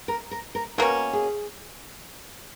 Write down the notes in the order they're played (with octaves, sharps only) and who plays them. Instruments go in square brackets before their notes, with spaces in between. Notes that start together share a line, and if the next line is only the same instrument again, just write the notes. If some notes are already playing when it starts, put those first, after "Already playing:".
[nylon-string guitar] A#4
A#4
A#4
[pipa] B2 A#3 C#4 [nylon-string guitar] A#4
[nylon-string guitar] G#4